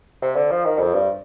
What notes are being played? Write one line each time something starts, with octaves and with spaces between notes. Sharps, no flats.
C3
D3
F3
D#3
F2
G2